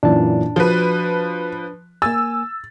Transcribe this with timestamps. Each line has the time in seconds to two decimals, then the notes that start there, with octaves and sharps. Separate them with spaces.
0.03 F#2 A#2 E3 D4 A5
0.56 F3 F#4 B4
2.02 A#3 G#5 E6 A6